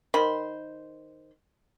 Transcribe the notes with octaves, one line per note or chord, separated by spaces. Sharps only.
D#3 C5 B5